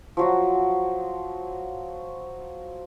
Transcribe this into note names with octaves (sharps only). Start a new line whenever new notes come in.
F3 F#3 F#4